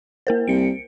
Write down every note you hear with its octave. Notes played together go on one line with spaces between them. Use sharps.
A#3 A#4 C5
C2 C#7 D7